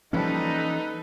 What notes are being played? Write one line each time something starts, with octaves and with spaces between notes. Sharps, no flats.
D#2 E3 F3 G3 C#4 D#4 A4 B4